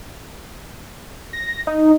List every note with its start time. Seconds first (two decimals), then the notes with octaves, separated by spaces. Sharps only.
1.33 A#6
1.67 D#4